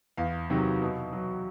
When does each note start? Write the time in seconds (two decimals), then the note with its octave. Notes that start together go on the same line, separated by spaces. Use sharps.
0.17 E2 F5
0.50 C3 D#3 F#3
0.81 B2
1.13 F#3